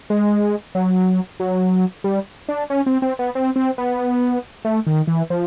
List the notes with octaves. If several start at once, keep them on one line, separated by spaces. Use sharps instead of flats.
G#3
F#3
F#3
G3
D4
C#4
C4
C4
B3
C4
C4
B3
A3
D#3
E3
F3